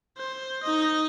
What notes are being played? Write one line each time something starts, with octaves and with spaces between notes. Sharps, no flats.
C5
D#4 D#5